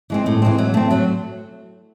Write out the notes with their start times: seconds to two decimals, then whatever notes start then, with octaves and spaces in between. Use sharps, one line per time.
0.10 E3 G#3 C4
0.26 A2
0.42 E3 G#3 C4
0.58 F#3
0.74 A3 C4
0.91 F#3